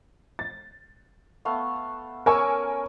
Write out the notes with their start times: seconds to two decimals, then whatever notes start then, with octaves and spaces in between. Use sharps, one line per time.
0.39 A6
1.45 A3 B3 F5
2.26 C#4 A#4 G#5 C#6 E6